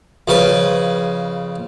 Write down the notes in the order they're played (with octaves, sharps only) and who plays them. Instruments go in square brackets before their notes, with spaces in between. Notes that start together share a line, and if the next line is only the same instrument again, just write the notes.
[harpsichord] F2 C#3 B4